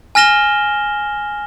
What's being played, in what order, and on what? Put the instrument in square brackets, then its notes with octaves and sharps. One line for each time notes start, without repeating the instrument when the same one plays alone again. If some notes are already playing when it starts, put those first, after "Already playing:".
[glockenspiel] G#5 F6 A#6 E7 G7